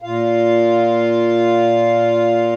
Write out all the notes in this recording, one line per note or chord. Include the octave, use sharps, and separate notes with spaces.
A#2 F4 F5